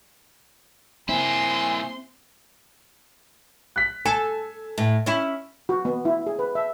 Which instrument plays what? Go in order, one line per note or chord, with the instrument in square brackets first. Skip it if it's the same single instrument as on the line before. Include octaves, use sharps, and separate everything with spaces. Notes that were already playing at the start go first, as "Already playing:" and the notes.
[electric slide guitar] A#3 E4 [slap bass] C4 [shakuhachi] G#5 [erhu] C6
[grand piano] F#6 B6
[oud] A4 [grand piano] G#5
[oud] A2
C#4 E4
[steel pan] F#4
B3
E4
G#4
B4
E5